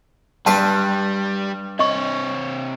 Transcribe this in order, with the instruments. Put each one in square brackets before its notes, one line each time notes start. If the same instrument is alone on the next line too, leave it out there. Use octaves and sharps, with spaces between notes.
[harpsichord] G2 B4 C6 [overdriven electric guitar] G3 [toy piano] A5
[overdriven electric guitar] C3 C#5 [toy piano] D#5 C#6